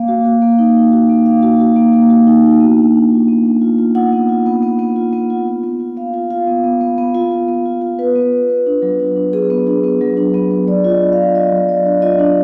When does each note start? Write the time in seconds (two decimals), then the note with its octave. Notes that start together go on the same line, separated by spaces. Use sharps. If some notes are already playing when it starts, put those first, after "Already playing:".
Already playing: A#3 F5
0.08 F#4
0.25 F#4
0.42 A#3
0.59 D#4
0.76 D#4
0.92 F#4
1.10 A#3
1.26 A#3 F5
1.43 F#4
1.60 F#4
1.76 A#3
1.93 A#3
2.10 F#4
2.27 D#4
2.43 A#3
2.60 B3
2.77 D4
2.94 D4
3.11 F4
3.28 B3
3.45 D4
3.61 F4
3.78 F4
3.95 F4 F#5
4.12 B3
4.29 F4
4.46 B3
4.63 B3
4.79 B3
4.96 F4
5.13 B3
5.30 F4
5.47 F4
5.63 B3
5.80 F4
5.97 B3 F5
6.14 F4
6.30 F4 F5
6.47 B3
6.64 B3
6.81 B3
6.98 B3
7.15 F4
7.32 B3
7.48 B3
7.65 F4
7.81 F4
7.99 F4 B4
8.15 B3
8.32 B3
8.50 B3
8.66 D4
8.82 F#3
8.99 D4
9.16 D4
9.33 B3 G#4
9.50 B3
9.67 D4
9.84 B3
10.01 F#3
10.17 D4
10.34 B3
10.51 B3
10.68 F#3 D5
10.85 F4
10.90 D#5
11.02 D4
11.13 F5
11.18 F4
11.35 F4 D#5
11.52 F#3
11.69 F4 D5
11.86 D4
12.02 F4 D#5
12.19 D4